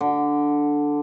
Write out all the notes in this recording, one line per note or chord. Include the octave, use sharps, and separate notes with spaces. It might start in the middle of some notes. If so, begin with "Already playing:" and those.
D3